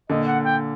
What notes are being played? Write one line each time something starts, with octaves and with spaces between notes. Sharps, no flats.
A#2 D3 D#5
F#5
G5